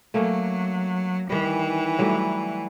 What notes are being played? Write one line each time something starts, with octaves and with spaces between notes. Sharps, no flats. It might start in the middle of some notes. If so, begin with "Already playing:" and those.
F#3 A3 A#3 C#4
D#3 E3 G3
F#3 G3 A3